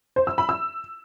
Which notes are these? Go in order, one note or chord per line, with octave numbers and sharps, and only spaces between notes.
C5
E6
B5
E6